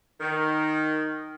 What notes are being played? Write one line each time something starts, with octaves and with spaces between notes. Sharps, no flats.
D#3